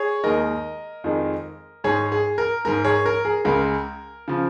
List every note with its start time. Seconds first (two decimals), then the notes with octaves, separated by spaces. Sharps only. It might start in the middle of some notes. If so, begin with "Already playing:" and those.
Already playing: G#4 C#5
0.24 D#2 D#3 G#3 A#4 D#5
1.04 F2 D#3 G#3
1.84 G#2 G#3 G#4 C#5
2.12 G#4
2.38 A#4
2.65 G#2 G#3 A#4
2.84 G#4 C#5
3.06 A#4
3.25 G#4
3.45 C#2 C#3 G#3 A#4
4.28 C#3 F3